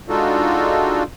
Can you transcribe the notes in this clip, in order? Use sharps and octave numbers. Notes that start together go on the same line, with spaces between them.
G#3 D4 D#4 F4 F#4 A4